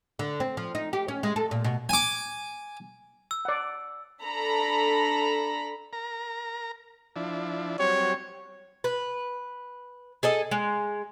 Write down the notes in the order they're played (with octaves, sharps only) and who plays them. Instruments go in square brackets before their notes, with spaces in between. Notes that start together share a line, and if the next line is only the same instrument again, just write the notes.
[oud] D3
C4
F3
D#4
G4
C#4
G#3
A4
A#2
B2
[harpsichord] G#5 D6
[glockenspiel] E6
[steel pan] D5 F#5
[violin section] D4 A4 A#5 B5
[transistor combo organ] A#4 A#5
F3 D4 E4
[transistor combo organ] F#3 G3 C4 [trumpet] C#5
[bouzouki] B4
G#4 A4 D#5
G#3